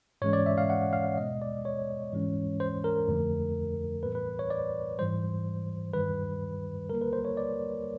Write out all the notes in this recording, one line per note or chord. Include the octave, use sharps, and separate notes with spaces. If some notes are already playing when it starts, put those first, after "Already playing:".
G#2 E3 G#3 C#4 C#5
D5
E5
F5
F#5
F5
B2 G#3 B3 D#5
D5
C#5
G#2 E3 G#3 C#4
C5
A#4
F2 D3 F3 A3
A2 E3 G3 B3 B4
B4
C#5
D5
G#2 E3 G3 C5
G2 D#3 G3 B4
D3 G3 A#3 A#4
B4
C5
C#5
D5